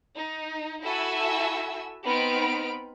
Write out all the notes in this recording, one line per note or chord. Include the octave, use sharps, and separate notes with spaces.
D#4
E4 F#4 A4 E5 G#5 E6
B3 C4 D#4 B5 F6 D7